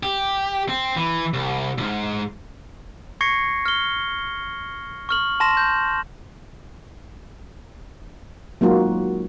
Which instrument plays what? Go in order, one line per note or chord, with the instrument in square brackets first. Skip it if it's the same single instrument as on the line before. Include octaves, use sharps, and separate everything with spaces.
[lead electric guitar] G4
C4
E3
C2
B1 G#2
[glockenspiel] C#6 G#6 A#6 C7 C#7
F6 G7
C#6 F6 F#7
A5 C6 A#6 E7
G6
[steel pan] F#3 G#3 A#3 D#4 F4 F#4